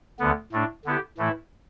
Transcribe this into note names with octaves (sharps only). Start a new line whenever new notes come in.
D2 D3 B3
A2 A3 D4
D3 B3 E4 G4
A2 E3 A3 E4